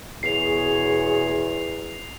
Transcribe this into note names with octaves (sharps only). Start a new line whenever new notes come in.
E2 B2 G#4 C#5 C7 F7